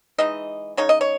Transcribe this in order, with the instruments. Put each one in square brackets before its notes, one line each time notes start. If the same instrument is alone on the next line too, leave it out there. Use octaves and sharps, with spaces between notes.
[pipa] E3 G#3 D#4 D#5
C#3 G#3 D#4 C#5
D#5
C#5